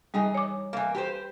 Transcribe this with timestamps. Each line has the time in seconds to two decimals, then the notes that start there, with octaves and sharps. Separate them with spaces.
0.14 E3 G3 D#4 G#4
0.35 C#5 D6
0.73 E3 A#3
0.95 G4 B4 C5